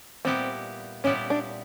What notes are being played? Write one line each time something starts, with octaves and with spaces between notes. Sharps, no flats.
A#2 G3 B3 C4 E4 G4
A#2 G3 B3 C#4 E4 G4
D4